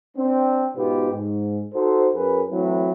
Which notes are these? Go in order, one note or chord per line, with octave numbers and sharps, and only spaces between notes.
C4 D4
G#2 B2 B3 D#4 F4 G4
G#2
D#4 F#4 A4 C5
F#2 G#4 A#4 B4
E3 F#3 A3 C4 E4